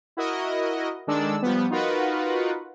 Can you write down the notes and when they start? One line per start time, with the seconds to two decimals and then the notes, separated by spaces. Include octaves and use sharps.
0.17 E4 F#4 A#4 D#5
1.07 D#3 G#3 D4 A4 D5 E6
1.42 F3 G3 B3
1.70 D#4 F4 F#4 A#4 B4 F#5